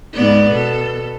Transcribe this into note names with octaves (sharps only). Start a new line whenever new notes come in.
G#2 B3 D5
B2 A4